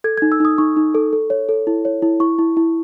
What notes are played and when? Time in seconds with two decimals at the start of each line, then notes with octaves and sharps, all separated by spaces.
0.04 A4 G#6
0.18 D#4 G#6
0.32 E6
0.40 D#4 D#6
0.58 D#4 C#6
0.77 D#4
0.95 A4
1.13 A4
1.30 C#5
1.49 A4
1.67 E4
1.85 C#5
2.02 E4
2.20 E4 C#6
2.39 E4
2.57 E4